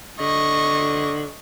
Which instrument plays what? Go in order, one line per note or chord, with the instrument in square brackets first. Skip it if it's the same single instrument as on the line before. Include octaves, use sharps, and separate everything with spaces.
[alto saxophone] D3 [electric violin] D#5 C#6